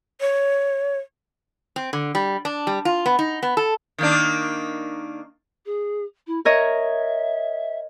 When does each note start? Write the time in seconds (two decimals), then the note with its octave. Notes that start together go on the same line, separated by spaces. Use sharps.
0.21 C#5
1.76 C4
1.93 D3
2.15 G3
2.45 D4
2.67 G3
2.85 F4
3.06 B3
3.19 D#4
3.43 B3
3.57 A4
3.98 D#3 A#3 D4
5.66 G#4
6.27 E4
6.45 A#4 C#5 D#5 E5